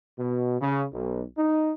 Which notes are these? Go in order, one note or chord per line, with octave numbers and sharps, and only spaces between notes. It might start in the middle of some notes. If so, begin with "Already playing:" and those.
B2
C#3
B1
D#4